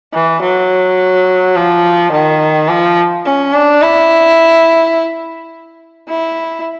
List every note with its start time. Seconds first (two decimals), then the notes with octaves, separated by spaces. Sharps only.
0.14 E3
0.42 F#3
1.56 F3
2.12 D#3
2.68 F3
3.25 C#4
3.53 D4
3.82 E4
6.09 E4